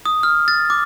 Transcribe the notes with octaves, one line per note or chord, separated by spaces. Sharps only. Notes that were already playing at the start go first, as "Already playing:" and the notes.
D#6
F6
A6
D6